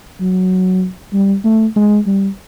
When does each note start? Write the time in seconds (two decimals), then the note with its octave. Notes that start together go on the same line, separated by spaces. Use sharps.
0.20 F#3
1.13 G3
1.44 A3
1.76 G#3
2.06 G3